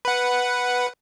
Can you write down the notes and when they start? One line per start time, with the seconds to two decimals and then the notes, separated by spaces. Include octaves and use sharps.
0.05 B4 F#5